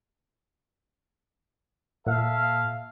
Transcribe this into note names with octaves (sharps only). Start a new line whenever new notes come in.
A#2 A4 E5 F5